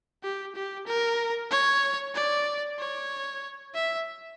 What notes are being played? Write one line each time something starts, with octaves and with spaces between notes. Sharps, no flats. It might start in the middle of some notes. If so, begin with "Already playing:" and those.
G4
G4
A#4
C#5
D5
C#5
E5